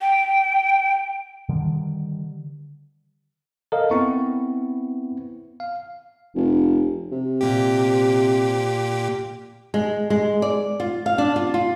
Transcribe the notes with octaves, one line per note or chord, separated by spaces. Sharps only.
G5
D3 D#3 G3
A4 A#4 D#5 F5
B3 C4 E4 C#6
F5
F1
C3
A#2 G4
G#3
G#3
D5
F4
F5
D4
F4
F4